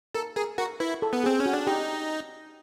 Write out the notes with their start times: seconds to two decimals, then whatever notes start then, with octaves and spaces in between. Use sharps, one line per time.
0.14 A4 A#4
0.36 G#4 A#4
0.58 F#4 A#4
0.80 E4 B4
1.02 A4
1.13 B3
1.24 C4 G#4
1.40 C#4
1.46 F#4
1.53 D4
1.67 D#4 G4